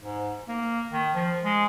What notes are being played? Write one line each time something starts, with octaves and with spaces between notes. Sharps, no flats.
G#2
A#3
D#3
F3
G#3